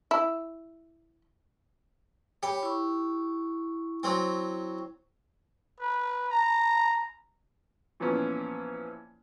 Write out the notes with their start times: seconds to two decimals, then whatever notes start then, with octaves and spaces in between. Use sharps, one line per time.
0.11 E4
2.43 G4 C#5 B5 D6
2.63 E4 C#6
4.03 F#3 C4
5.80 B4
6.30 A#5
8.00 A#2 E3 F3 B3 C#4